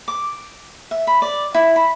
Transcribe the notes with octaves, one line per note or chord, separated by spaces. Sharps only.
D6
E5
B5
D5
E4
B5